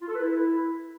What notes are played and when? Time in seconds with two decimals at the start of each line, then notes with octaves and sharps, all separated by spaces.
0.02 F4
0.08 A4
0.15 B4
0.22 E4